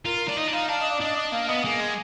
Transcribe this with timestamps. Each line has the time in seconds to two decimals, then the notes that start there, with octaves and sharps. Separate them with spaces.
0.06 F4 A#4
0.16 A#4
0.29 D4
0.37 D#4 D#5
0.48 D4
0.53 D#4 F5
0.69 D4 F5
0.80 D#5
0.90 D5
1.01 D4 D#5
1.16 D#5
1.32 A#3 F5
1.48 B3 D#5
1.64 A#3 G#4
1.80 G#3